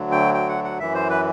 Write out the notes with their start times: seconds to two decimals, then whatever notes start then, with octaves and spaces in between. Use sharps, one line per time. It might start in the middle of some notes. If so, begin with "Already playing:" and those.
Already playing: D2 D3 F#3
0.12 G5
0.34 G5
0.49 F#5
0.64 F#5
0.80 F#2 E3 E5
0.94 C5
1.10 B4